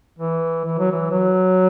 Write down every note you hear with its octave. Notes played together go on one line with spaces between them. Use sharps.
E3
E3
F#3
E3
F#3